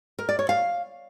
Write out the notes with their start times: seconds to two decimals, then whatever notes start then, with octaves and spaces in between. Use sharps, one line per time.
0.19 A#4
0.29 D5
0.39 C#5
0.49 F5